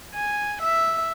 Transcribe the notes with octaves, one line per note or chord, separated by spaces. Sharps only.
G#5
E5